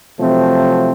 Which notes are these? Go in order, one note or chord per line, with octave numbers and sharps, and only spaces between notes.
C3 F3 F#3 A3 C4